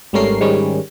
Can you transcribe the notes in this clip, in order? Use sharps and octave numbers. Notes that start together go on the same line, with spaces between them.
G#1 G3 A3 C#4 A#4 C7
G#2 D#3 G3 C#4